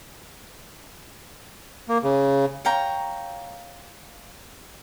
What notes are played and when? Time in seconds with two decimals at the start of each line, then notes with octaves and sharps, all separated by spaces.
1.89 A#3
2.04 C#3
2.65 C#5 F5 G5 A#5